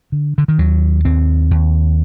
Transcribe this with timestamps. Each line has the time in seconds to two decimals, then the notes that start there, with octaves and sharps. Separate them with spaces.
0.12 D3
0.38 D3
0.48 D#3
0.58 D#2 F#3
1.05 D#2 C4
1.51 D#2